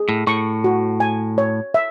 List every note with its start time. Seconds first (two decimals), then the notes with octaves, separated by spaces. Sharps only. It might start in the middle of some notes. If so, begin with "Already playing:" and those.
Already playing: G#4
0.09 A2
0.27 A2 C#6
0.64 F#4
1.00 G#5
1.38 C#5
1.74 E5